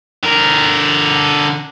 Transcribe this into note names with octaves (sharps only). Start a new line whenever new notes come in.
D3 A#4